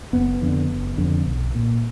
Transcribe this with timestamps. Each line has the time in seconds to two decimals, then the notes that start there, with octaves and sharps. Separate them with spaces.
0.13 F#1 B3
0.41 F2 D3
0.70 F#1
0.98 F2 D3
1.26 B1
1.55 A#2